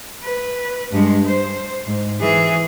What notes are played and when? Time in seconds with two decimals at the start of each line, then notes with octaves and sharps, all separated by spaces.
0.23 B4
0.91 G2 G#3
1.26 C5
1.86 G#2
2.20 E3 G#4